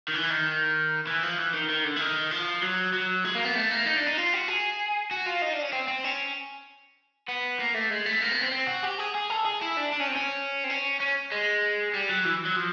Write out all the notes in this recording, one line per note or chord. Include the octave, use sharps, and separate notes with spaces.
D#3
E3
D#3
E3
F3
E3
D#3
D#3
D3
E3
D#3
F3
F#3
F#3
G#3
A#3
B3
A3
A#3
D#4
D4
D#4
F4
F#4
G#4
F#4
F4
D#4
D4
C#4
C4
C4
C#4
B3
A#3
A3
G#3
A3
A#3
B3
C4
C4
F#4
G4
G#4
G#4
A4
G#4
E4
D4
D4
C#4
C4
C#4
C4
C#4
C#4
G#3
G3
F#3
E3
F#3
F3